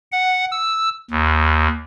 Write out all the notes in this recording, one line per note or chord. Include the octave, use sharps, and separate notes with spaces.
F#5
E6
D#2